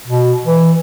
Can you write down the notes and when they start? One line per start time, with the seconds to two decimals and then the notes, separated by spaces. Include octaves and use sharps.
0.07 B2
0.45 E3